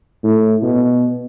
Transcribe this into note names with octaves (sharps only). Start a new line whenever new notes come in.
A2
B2